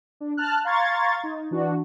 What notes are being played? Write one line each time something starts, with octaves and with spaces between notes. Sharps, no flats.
D4
A5 F6 F#6
F5 A#5 C6 C#6 G#6 A6
D#4
E3 D4 F#4